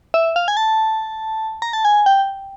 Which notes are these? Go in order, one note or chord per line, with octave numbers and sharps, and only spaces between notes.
E5
F5
G#5
A5
A#5
A5
G#5
G5